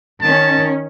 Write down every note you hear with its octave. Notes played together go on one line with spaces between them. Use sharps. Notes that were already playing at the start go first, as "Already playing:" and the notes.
D#3 C#4 A5